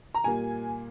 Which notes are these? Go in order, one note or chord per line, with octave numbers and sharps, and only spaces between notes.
A#5
A#2 G3 A#3 G#5